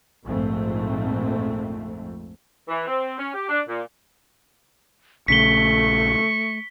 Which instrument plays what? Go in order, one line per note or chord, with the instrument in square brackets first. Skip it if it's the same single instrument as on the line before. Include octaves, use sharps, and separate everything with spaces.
[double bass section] A#1 F2 G#2 A3 C4
[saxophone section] E3
C4
C#4
G4
D4
A#2
[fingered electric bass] A#1 C#3 [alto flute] A3 [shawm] C#6 [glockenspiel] B6 G7